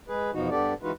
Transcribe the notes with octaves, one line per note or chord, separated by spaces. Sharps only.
G#3 G#4 B4
E2 B2 F3 D#4 F#4
G2 B3 D4 G4 A4 D5
E3 G#3 D#4 F4 F#4 B4